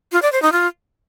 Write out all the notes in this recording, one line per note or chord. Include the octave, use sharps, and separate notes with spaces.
F4
D5
C5
D#4
F4